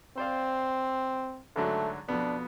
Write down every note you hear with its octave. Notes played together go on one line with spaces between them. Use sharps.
C4 C5 D5 F5
G#2 D3 F#3 A3
F2 B2 B3 D4